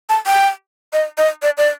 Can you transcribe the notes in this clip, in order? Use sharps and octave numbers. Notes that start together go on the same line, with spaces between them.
A5
G5
D#5
D#5
D5
D5